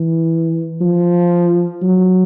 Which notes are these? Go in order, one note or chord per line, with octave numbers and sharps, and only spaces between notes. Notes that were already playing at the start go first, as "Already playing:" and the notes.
Already playing: E3
F3
F#3